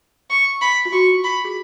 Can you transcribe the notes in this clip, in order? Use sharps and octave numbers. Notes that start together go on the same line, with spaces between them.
C#6
B5
F4
F#4 C#6
B5
G#4